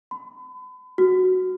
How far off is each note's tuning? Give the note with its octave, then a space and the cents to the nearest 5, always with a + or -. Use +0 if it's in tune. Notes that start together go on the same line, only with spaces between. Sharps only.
B5 +40
F#4 +0